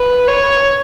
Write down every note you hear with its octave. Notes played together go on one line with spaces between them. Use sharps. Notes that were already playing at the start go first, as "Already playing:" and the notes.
Already playing: B4
C#5